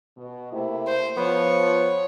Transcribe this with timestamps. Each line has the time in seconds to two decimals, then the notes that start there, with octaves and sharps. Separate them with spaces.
0.17 B2
0.53 C3 A3 A#3 E4
0.87 C5
1.17 F3 B3 C#5